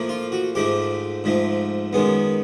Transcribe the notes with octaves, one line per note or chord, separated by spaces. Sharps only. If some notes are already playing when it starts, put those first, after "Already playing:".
Already playing: A2 F3 A#3
F4
F#4
G#2 F3 A3 G4
G#2 F3 A3
F#2 D#3 G#3 B3